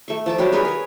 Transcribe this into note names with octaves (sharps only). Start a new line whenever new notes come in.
A3 C#6
F3 A5 D6
F#3 G3 D4 G4
G#4 A#4 B4 C#5
G#4 C#5